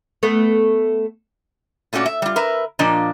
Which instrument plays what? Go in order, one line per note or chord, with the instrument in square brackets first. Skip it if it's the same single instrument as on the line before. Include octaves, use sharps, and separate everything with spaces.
[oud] A3 B3
[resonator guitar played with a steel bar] A#2 A3 C#4 F#4 D5
E5
G3 F4
A#4 B4 E5
A#2 F3 A#3 D4 D#5